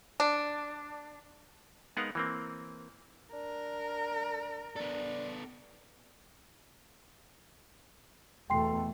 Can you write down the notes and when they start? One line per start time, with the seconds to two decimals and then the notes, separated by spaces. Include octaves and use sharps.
0.20 D4
1.97 G#3 B3 D#4 A#4 F5 F#5
2.15 E3 A#3 C4
3.34 D4 A#4
4.76 B3 D4 A4
8.50 E2 B2 A3 G5 C6 C7